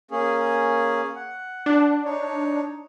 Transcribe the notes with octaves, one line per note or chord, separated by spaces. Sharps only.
A#3 C#4 G#4
F#5
D4
D#4 C#5